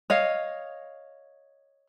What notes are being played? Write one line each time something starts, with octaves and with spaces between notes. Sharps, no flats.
C#5 D#5 F5